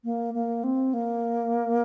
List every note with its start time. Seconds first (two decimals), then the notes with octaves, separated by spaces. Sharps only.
0.04 A#3
0.34 A#3
0.64 C4
0.94 A#3